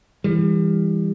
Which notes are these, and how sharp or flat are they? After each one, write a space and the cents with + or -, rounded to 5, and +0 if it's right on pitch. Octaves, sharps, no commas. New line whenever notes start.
E3 +0 G3 +35